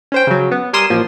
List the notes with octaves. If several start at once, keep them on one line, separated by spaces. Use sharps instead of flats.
C#4 C5 G5
C#3 F#3
B3
G3 A#4 G#5 C6 D#6 E7
A1 F3 A#3